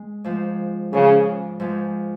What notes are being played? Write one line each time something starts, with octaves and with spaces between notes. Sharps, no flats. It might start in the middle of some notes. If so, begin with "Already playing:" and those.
Already playing: G#3
G#2 F3 G#3
G#2 C#3 F3 G#3
G#2 F3 G#3